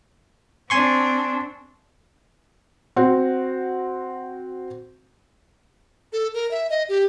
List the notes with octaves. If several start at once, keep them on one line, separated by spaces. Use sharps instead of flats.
C4 D4 G#5 C6 C#6
C4 F#4
A4
A#4
E5
D#5
G4